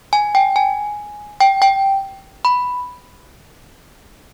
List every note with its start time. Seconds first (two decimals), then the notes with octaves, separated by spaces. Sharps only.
0.13 G#5
0.35 G5
0.56 G#5
1.40 G5
1.62 G5
2.45 B5